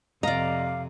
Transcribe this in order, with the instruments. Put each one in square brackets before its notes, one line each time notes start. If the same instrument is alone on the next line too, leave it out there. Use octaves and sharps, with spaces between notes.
[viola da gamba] F2 C3 [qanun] D5 A#5 [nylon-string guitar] D#5 [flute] F5